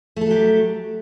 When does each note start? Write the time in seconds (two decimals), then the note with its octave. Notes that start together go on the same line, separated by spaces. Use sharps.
0.16 A3
0.21 A4
0.26 F#3
0.31 G4